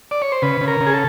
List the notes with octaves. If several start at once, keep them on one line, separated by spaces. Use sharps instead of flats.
D5
C#5
C5
C#3 B4
C#3
A#4
C#3
G#4
A4